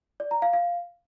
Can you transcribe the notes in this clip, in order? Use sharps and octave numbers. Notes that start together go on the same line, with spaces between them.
D5
A#5
F5
F5